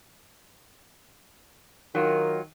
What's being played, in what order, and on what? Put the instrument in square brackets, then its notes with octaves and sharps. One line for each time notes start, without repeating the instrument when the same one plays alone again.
[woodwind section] D#3 [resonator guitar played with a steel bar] F#3 F4